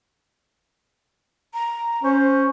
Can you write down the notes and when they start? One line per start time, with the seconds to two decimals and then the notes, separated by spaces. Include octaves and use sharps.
1.54 A#5
2.04 C#4 C5